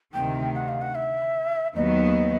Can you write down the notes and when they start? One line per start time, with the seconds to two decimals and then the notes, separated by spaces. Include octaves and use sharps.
0.14 D2 C3 D#3 G5
0.55 F#5
0.68 F5
0.81 F#5
0.95 E5
1.76 D#2 D#3 F#3 B3 D#5